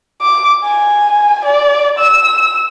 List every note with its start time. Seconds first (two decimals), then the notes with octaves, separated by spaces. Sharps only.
0.22 D6
0.64 G#5
1.45 D5
1.99 E6